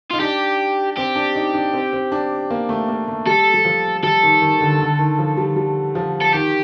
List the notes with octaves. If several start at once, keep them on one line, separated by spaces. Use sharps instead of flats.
D#4 F4
D4 G4
C4 G4
D4
D#4
D4
C4
C4
D4
A#3
A3
A#3
A3
G3 A4
G3
F3
G3 A4
D#3
D#3
D3
D3
D#3
F3
G3
G3
F3
A4
D#3 G4